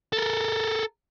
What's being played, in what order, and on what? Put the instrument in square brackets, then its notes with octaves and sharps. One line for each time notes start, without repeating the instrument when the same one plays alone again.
[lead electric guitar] A4 A#4